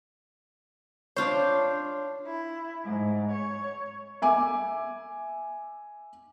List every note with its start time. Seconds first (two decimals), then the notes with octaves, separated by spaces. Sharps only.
1.16 D4 F4 C5 C#5
2.26 E4
2.83 G#2
3.30 C#5
4.22 E5 G#5 D6